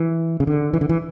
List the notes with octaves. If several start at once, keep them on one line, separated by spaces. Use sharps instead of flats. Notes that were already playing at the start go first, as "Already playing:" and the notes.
Already playing: E3
C#3
D3
E3
D3
E3